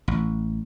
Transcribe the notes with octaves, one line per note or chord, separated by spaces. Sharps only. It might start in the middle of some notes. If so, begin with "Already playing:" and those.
A1